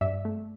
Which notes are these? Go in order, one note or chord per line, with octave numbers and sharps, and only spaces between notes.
G2 D5 E5
A3